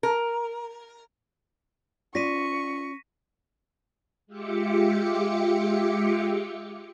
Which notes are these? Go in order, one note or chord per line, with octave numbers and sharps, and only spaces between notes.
A#4
C#4 F4 D5 C#6 A#6 B6 D#7
G#3 F4 G4 E5 D6 C#7